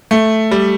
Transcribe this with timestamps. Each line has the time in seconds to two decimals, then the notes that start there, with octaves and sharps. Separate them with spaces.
0.11 A3
0.51 G3